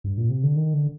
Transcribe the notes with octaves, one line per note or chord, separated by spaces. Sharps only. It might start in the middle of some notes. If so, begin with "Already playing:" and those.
G2
A#2
C3
D3
D#3
D3